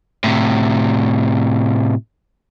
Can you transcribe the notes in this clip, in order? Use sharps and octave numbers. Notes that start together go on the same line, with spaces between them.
A2 C3